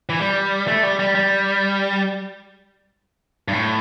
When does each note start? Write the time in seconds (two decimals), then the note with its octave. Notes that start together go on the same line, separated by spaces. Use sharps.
0.09 E3
0.20 G3
0.68 A3
0.83 G3
0.99 G3
1.15 G3
3.48 G2
3.53 A2